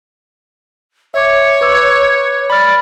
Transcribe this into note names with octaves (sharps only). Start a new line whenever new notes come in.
C#5 E5 D6
B4 D6 E6
D5 B5 F6